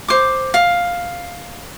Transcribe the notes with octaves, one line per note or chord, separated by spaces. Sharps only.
C5 D6
F5